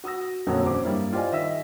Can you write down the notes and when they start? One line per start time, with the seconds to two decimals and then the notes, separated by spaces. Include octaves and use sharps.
0.04 F#4 D#6 E6 A#6
0.47 F2 A#2 D3 F#3 A#3 C#4
0.63 D#1 A#1 C#4 C5 D6
0.84 G2 G3 A#3 E4
1.13 F4 G4 C5 D5 D#5 G#5
1.32 D#3 D#5 E5 E6 B6